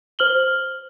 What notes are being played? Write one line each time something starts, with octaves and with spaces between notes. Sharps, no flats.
C5 F6 F#7 G7